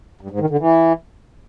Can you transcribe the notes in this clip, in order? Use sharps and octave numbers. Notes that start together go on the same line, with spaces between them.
G2
G#2
D#3
D3
E3